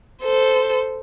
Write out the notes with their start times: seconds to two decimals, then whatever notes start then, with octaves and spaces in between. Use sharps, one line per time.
0.22 A4 C5